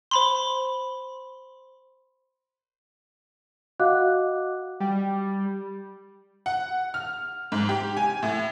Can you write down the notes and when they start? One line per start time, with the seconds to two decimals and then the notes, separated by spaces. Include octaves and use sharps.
0.11 C5 B5 C6
3.80 F#4 D#5 F5 F#5 D6 F#6
4.80 G3
6.46 F#5
6.94 F6
7.52 G#2
7.69 G4
7.97 G#5
8.23 A2